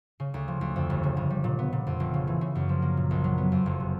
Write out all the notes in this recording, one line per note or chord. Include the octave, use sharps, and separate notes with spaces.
C#3
D2
F3
D2
F2
G1
C#3
G1
G3
A#2
B3
A#2
F2
F1
C#3
E3
C#3
F#2
F3
A#3
A#2
A#1
F#3
B3
F2
F#1
C3